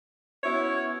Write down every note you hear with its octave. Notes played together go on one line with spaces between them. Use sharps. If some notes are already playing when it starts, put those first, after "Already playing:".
B3 C#4 E4 F#4 C#5